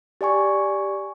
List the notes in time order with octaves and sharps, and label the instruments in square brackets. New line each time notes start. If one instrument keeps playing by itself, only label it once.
[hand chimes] G4 D5 G#5 C#6